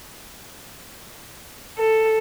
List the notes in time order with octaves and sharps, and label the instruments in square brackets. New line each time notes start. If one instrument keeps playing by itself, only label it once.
[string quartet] A4